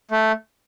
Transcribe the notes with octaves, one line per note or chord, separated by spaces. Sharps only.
A3